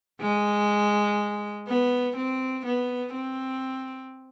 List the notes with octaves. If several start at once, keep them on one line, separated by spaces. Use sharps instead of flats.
G#3
B3
C4
B3
C4